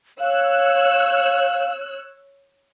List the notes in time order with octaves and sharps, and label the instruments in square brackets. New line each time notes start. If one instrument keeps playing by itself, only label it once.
[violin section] C#5 E6 F#6 [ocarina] F5